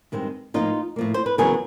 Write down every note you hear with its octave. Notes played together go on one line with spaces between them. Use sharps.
G2 D#3 G#3 C4
A2 F3 A#3 D#4 F4
A2 F3 A#3
C5
B4
E2 C#3 F#3 B3 G#4 A#4